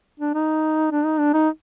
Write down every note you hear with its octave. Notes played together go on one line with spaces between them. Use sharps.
D4
D#4
D4
D#4
D4
D#4